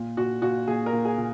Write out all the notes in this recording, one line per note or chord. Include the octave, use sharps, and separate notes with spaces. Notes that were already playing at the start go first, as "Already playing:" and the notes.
Already playing: A#2
A#2 F#4
A#2 F#4
A#2 G#4
A#4
A#2
G#4
A#2